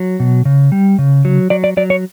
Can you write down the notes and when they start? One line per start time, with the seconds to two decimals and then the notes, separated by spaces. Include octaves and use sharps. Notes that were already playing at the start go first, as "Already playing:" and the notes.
Already playing: F#3
0.20 B2
0.45 C#3
0.72 G3
0.99 C#3
1.25 F#3
1.50 F#3 D5
1.64 D5
1.77 F#3 D5
1.90 C#5